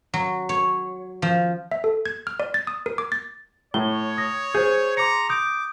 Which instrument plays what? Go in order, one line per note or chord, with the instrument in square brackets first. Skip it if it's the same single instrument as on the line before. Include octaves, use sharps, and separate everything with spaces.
[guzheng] F#3
C#5
F3
[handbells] E5
A4
G#6
F6
D5
A6
D#6
A#4
D6
A6
[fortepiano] A2 [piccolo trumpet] C#5 [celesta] G7
[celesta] D#6 A#6
[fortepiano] G#4 [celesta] C5 G6
[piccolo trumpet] A#5 [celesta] C6 D6 C#7
[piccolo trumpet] D6 [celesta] D#6 G6